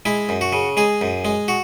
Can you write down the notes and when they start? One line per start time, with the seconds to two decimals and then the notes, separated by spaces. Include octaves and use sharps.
0.05 G#3 E4
0.29 F#2
0.41 F#4
0.53 C#3
0.77 G#3 G#4
1.01 F#2
1.25 G#3
1.48 F#4